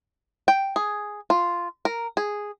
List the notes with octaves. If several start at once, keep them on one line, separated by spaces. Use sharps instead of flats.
G5
G#4
F4
A#4
G#4